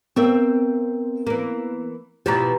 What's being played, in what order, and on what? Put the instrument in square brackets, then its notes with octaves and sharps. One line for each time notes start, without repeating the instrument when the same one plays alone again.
[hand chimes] B3 A#4 [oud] C4 E5
[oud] E3 A#3
[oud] B2 E3 F3 [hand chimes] G4 A#5